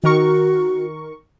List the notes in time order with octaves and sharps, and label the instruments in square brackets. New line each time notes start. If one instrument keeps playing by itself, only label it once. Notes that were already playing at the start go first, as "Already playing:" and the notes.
[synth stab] D#3 A#4 C#6 [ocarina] F#4